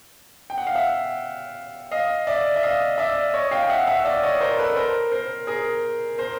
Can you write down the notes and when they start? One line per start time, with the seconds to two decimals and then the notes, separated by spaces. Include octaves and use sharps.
0.50 G5
0.58 F#5
0.67 F5
0.75 E5 F#5
1.91 D#5 F5
2.27 D5 E5
2.56 E5
2.63 D#5 F5
2.98 D5 E5
3.34 C#5 D#5
3.51 F5 G5
3.63 G5
3.70 E5 F#5
3.88 E5 F#5
4.05 D5 E5
4.23 C#5 D#5
4.40 A#4 C5
4.58 A4 B4
4.77 A#4 C5
5.12 A#4 C5
5.47 G#4 A#4
6.18 A#4 C5